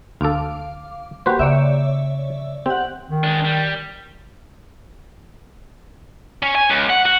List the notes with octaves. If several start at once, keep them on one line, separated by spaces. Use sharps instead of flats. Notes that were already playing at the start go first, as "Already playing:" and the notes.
D2 A4 F5 D6
A#3 F#4 G4 B4 C5
C#3 C#5 D5 E5
C4 G4 F#5
D#3
G#3 D4
G3
C#4
G#5
C#2
F#5
F#4